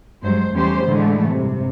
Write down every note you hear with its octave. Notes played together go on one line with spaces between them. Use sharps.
G2 F#3 G#3 C5
E2 G3 A3 C#4 G4 C5
A2 D3 E3 G#3 A3
G2 C3